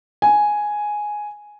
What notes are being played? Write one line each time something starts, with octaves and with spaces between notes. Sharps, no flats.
G#5